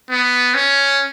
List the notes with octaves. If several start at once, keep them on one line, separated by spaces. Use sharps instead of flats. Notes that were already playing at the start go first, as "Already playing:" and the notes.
B3
C#4